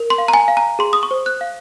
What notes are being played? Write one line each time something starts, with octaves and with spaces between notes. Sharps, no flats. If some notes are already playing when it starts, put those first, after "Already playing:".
Already playing: A#4
C6
F5
A#5
G#5
F5
A#5
G#4 C6
D#6
C#6
C5
F#6
F5